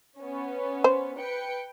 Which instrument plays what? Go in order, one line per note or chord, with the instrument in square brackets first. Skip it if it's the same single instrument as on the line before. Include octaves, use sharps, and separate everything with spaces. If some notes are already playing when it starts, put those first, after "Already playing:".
[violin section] B3 C#4
[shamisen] C5
[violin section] B4 G5 C#7